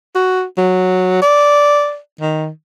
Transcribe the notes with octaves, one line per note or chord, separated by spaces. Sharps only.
F#4
F#3
D5
D#3